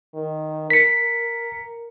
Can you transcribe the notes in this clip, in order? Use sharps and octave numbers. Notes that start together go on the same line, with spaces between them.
D#3
A#4 B6 C#7